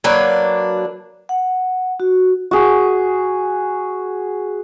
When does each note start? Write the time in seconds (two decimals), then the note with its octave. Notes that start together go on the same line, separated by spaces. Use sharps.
0.04 F#3 A#3 D4 B4
1.29 F#5
2.00 F#4
2.51 F#4 G#4